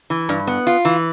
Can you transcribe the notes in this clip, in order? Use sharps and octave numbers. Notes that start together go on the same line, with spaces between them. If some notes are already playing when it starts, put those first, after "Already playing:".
E3
G2
B3
F4
E3